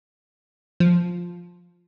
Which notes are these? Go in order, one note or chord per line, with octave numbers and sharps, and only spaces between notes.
F3